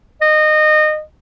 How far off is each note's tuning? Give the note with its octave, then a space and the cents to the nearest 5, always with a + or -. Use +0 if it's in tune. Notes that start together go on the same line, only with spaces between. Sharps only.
D#5 -25